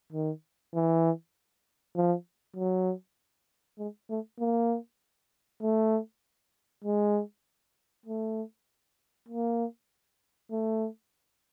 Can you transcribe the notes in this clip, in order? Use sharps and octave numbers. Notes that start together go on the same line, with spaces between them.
D#3
E3
F3
F#3
G#3
A3
A#3
A3
G#3
A3
A#3
A3